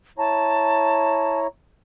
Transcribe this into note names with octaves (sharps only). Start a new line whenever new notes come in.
E4 C#5 A5 A#5